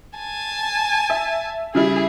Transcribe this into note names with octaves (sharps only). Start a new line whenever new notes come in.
G#5 A5
E5
C#3 G3 E4 G#4